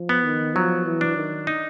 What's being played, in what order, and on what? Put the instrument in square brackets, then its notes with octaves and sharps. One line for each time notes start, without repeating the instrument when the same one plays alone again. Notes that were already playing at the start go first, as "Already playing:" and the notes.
Already playing: [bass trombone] F3
[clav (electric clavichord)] B3
[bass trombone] D#3
[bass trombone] F3 [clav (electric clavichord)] F#3
[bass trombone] E3
[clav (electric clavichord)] D4
[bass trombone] D#3
[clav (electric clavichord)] D#4